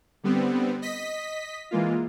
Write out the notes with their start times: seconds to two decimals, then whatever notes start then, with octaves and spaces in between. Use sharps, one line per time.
0.23 D3 G3 B3 C4
0.82 D#5 B6
1.71 E3 G#3 A#3 F4